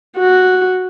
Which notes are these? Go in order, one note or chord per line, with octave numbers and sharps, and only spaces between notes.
F#4